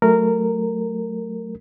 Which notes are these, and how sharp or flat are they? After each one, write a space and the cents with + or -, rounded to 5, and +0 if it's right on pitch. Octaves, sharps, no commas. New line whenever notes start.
F#3 +0 A3 +0 A#4 -15